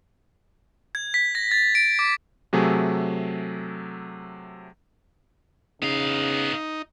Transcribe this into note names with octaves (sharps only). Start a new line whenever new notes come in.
G#6
B6
A#6
A6
D7
D6
C3 F#3 A3 G#4
C#3 B3 D#4 F5